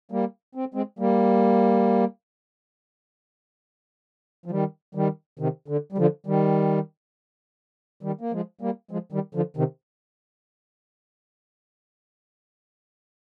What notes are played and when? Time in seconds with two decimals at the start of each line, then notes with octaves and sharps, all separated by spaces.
0.11 G3 A#3
0.55 C4
0.74 G#3 C4
0.99 G3 A#3
4.46 F3
4.51 D#3 G3
4.95 D#3 G3
5.39 C3 D#3
5.68 D3
5.92 G3
5.98 D3 F3
6.26 D#3 G3
8.03 D#3 G3
8.21 A#3
8.32 F3 G#3
8.61 G3 A#3
8.91 F3 G#3
9.12 D#3 G3
9.35 D3 F3
9.57 C3 D#3